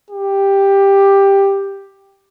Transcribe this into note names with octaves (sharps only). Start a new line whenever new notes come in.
G4